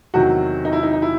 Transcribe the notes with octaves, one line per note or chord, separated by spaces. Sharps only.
E2 C3 D#3 F#3 F#4
D#4
E4
D#4
D#4
E4